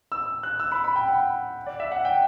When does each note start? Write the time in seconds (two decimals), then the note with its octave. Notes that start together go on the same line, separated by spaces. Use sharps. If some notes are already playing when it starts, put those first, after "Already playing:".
0.12 E6
0.43 F#6
0.60 E6
0.72 B5
0.84 B5
0.96 G5
1.08 F#5
1.66 D5
1.80 E5
1.92 F#5
2.05 G5